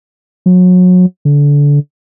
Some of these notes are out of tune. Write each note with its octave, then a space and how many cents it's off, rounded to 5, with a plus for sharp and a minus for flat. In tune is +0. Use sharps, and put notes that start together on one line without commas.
F#3 -30
D3 -25